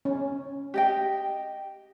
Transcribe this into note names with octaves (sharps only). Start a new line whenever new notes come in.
C#4
G4 D#5 G5